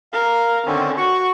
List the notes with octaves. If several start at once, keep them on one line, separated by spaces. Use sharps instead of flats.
A#4 F5
D3 D#3 C4 C#4
F#4 C#6